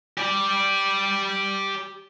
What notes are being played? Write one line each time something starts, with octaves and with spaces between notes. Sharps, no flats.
G4 D5